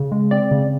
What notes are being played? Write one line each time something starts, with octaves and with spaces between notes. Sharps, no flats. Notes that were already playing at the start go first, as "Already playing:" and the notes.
Already playing: C#3
G#3
C4 D5
C#3